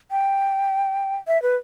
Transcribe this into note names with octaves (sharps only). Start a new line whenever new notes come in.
G5
E5
B4